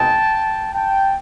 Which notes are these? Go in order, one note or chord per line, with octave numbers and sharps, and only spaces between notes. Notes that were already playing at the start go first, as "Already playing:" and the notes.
Already playing: B2 G#3 C4 D#4 G5 A5
G5 A5